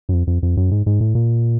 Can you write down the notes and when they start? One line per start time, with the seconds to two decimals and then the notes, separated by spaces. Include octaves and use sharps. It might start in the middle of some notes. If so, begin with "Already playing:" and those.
0.09 F#2
0.13 F2
0.27 F2
0.43 F2
0.57 F#2
0.71 G#2
0.86 G#2
1.01 A2
1.15 A#2